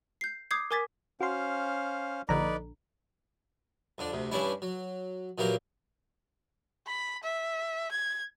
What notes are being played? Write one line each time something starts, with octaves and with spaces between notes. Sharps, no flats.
G6 C7
D6 D#6 G6 G#6 C7
A#4 G#5 D6 G#6 A6 B6
C#4 F#4 C5 F5 C6
A#1 D3 D#4 B4 D5 A#5
F2 D3 D4
D2 C3
G2 E3 G3 C#4 D4 E4
F#3
A#2 E3 F#3 A#3 G4 A#4
B5
E5
G#6